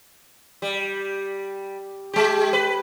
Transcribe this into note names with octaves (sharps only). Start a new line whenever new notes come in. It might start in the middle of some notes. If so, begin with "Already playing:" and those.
G3
G#3 G4
B4